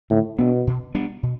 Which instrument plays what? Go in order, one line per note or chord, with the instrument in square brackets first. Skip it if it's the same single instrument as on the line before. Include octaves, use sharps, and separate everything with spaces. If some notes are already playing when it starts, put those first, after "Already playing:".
[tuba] A2 [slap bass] D3
[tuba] B2 [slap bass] B3 D4
[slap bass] B2
G3 B3 D4
B2